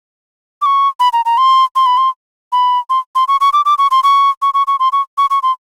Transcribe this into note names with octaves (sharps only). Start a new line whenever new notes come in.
D6
C#6
B5
A#5
A#5
C6
C6
B5
C6
B5
C6
C6
C#6
C#6
D6
D6
C#6
C6
C#6
C#6
C#6
C#6
C6
C#6
C#6
C#6
C6